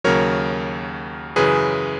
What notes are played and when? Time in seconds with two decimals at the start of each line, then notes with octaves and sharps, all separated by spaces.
0.04 D#2 C#3 F#3 A#4 C#5
1.36 F#2 C#3 E3 G#4 B4